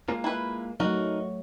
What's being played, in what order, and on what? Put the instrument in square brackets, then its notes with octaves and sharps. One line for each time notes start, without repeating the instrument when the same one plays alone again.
[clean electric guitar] G#3 A#3 F4
[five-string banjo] E4 B4
[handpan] F#3 A3 [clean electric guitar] D#4 A#4 D#5 [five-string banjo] F#4